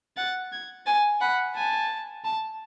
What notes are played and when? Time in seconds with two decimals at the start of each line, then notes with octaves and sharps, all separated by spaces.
0.17 F#5 A6
0.52 G#6
0.86 G#5 A6
1.21 F#5 B5
1.56 G#5 A5
2.25 A5